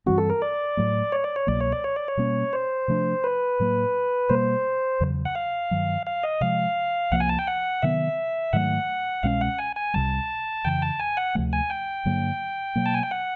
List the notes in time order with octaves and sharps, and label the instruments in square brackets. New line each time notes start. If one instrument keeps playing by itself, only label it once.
[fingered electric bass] G2 E3 G3 C4 [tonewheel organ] F#4
[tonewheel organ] A4
A#4
D5
[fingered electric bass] A2 F#3 A3
[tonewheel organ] C#5
D5
C#5
[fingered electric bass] C2 B2 F#3 A#3 [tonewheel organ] D5
[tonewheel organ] C#5
D5
C#5
D5
C#5
[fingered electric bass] B2 G3 A#3 C#4
[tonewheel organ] C5
[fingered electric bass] C3 F3 A3 D4
[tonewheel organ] B4
[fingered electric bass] A2 F#3 A#3
[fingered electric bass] B2 G3 A#3 [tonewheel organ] C5
[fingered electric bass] E2 C#3 F#3
[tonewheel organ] F#5
F5
[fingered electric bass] G2 D#3 F#3
[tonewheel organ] F5
D#5
[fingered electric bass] C3 F3 G#3 [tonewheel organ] F5
[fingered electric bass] C2 C3 F3 A#3 [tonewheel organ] F#5
[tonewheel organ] G#5
A5
G5
F#5
[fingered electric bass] C3 D#3 F#3 B3 [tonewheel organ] E5
[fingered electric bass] G#2 D#3 F#3 A3 [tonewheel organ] F#5
[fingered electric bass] C2 B2 G#3 C#4 [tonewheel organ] F5
[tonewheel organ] F#5
G#5
G#5
[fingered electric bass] C2 C3 D#3 G3 [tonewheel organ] A5
[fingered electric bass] F2 C#3 E3 [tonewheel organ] G5
[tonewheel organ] A5
G#5
F#5
[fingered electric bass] D2 C3 F3 A3
[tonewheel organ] G#5
G5
[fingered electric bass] G2 D3 F#3 A#3
B2 F#3 A#3
[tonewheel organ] A5
G#5
G5
F#5